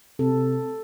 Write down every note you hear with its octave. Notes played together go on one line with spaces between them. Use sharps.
C3 A4